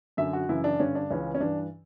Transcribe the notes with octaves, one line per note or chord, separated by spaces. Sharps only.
F#2 D3 E5
F#4
F#2 C#3 E3 E4
D4
G2 D3 C#4
D4
C#2 C#3 E3 C#4
C#4
G2 E3 D4